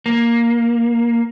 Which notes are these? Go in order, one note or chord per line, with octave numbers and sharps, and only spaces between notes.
A#3